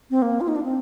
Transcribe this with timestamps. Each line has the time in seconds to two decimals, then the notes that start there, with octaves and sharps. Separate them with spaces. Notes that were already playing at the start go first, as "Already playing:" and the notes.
0.10 C4
0.22 A#3
0.41 F4
0.48 D#4
0.56 D4
0.63 C4